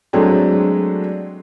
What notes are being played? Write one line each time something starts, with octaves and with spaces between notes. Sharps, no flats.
F#3 G#3 A3 C4 D4